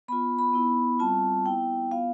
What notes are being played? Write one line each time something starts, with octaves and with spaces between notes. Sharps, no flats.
B3 F4 B5
B5
B3 E4
G3 C4 F4 A5
B3 E4 G5
B3 F4 F5